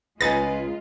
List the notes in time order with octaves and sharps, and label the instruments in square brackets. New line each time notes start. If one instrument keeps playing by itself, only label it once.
[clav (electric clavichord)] C#2 D#4 [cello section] G#3 F4 [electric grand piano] B4 G#5 [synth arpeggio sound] A6